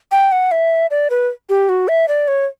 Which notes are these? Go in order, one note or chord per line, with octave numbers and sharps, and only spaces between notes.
G5
F#5
E5
D5
B4
G4
F#4
E5
D5
C#5